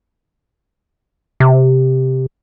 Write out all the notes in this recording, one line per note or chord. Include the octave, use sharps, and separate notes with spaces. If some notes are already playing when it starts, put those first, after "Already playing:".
C3